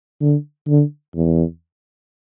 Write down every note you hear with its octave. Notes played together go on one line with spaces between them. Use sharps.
D3
D3
E2